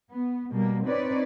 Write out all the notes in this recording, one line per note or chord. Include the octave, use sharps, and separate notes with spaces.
B3
B2 G3 A#3
C4 D#4 B4 C#5 D5